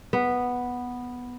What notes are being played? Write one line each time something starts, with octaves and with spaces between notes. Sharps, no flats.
B3